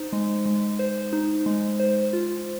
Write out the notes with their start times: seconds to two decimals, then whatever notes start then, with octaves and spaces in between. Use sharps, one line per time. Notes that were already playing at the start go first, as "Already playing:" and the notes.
Already playing: D#4 C5
0.13 G#3
0.46 G#3
0.79 C5
1.13 D#4
1.46 G#3
1.80 C5
2.13 F4